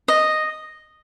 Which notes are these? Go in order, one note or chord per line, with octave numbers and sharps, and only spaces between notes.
D#5